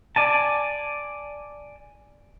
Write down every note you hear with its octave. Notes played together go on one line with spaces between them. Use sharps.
D5 G#5 A5